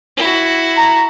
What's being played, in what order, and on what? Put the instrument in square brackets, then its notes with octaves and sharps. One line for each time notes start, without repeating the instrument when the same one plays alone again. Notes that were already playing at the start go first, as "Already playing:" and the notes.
[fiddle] E4 F#4
[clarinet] A#5